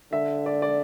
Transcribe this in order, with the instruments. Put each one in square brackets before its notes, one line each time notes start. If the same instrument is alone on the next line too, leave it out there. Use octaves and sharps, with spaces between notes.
[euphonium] D3 [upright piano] E5
[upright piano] D5
D5